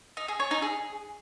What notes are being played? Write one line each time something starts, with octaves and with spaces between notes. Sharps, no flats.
D#4
G#4
C#5
D#4
G#4